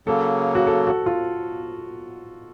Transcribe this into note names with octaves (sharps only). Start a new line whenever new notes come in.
C#3 F#3 A#3 A4
F#4
A4
F#4
F4